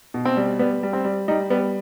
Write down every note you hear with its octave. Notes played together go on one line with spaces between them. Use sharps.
B2
C4
G3
G3 B3
G3
C4
G3
G3 D#4
G3 B3